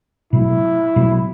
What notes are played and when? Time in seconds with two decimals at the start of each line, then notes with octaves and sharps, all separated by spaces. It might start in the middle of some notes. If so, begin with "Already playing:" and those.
0.33 B2 F#3 A3 E4
0.96 B2 F#3 A3